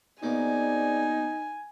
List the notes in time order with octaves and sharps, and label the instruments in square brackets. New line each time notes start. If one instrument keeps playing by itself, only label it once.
[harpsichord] B2 A#3 [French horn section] C4 G#4 D5 [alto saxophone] D#4 [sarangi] G#5